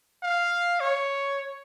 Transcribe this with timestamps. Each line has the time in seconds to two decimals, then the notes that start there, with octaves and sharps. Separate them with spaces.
0.23 F5
0.80 C#5